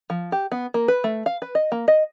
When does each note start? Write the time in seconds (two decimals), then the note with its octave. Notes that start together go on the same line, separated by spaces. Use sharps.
0.10 F3
0.32 G4
0.52 B3
0.74 A#3
0.88 B4
1.04 A3
1.26 F5
1.42 B4
1.55 D#5
1.72 A#3
1.88 D#5